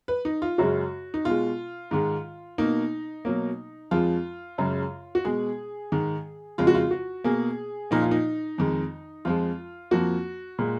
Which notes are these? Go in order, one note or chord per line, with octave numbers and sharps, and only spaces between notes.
B4
D#4
F4
F#2 C#3 G#3 F#4
D#4
B2 G#3 F4
G#2 D#3 G#3
B2 A#3 D#4
B2 F#3 A#3
F2 F3 G#3 F4
F#2 C#3 G#3
F#4
B2 G#3 G#4
G#2 D#3 G#3
F2 C#3 G#3 F4
F#4
F4
F#4
B2 A#3 G#4
A#2 F3 A#3 D#4
F4
D#4
F2 D#3 G#3
F2 F3 G#3 F4
F2 F3 A#3 F#4
A#2 G#3